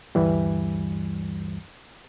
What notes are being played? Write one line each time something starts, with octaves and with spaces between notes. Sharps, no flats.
D2 G2 E3 G3